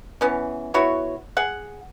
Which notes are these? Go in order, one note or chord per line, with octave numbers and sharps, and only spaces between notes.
E3 B3 C#4
B3 E4 F#4 C#5
G#4 F#5